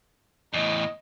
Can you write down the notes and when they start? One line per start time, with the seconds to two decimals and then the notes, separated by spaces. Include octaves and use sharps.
0.53 E2 A2 D#5